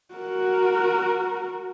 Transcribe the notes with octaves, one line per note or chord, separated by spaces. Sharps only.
F#4 A#4